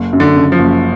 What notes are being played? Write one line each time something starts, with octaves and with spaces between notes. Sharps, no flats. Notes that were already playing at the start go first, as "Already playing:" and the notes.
Already playing: F#1
F#2
D3
C#3
F3
F#1